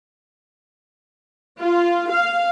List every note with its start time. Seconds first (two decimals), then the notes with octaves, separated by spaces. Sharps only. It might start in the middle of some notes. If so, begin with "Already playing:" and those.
1.60 F4
2.12 F5